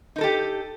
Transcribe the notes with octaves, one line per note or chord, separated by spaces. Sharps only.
D#4 G4 A4 A#4